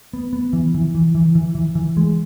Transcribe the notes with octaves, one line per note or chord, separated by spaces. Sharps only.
B3
B3
E3
E3
E3
E3
E3
E3
E3
G#3